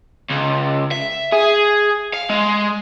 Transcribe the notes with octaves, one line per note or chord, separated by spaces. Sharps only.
C#2
E5
G#4
F5
G#3